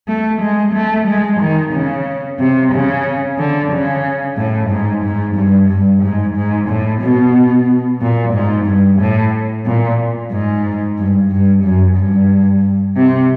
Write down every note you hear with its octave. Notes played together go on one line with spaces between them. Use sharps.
A3
G#3
A3
G#3
D#3
C#3
C3
C#3
D3
C#3
A2
G#2
G#2
G2
G2
G#2
G#2
A2
B2
A#2
G#2
G2
A2
A#2
G#2
G2
G2
F#2
G2
C3